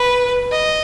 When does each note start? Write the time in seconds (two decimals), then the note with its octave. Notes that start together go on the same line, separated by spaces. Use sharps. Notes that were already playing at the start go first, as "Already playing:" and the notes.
Already playing: B4
0.51 D#5